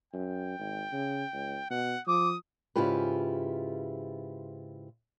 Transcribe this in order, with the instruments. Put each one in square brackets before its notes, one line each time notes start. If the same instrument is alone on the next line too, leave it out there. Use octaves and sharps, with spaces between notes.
[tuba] F#2 [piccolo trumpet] G5
[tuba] G#1
C#3
C#2
[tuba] B2 [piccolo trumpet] F#5
[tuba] F3 [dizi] D6 [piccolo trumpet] D#6
[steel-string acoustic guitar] G#2 C#3 E4 F4 G4 B4